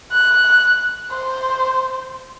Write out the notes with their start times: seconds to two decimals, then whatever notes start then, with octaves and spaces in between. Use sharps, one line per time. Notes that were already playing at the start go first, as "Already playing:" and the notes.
0.12 F#6
1.11 C5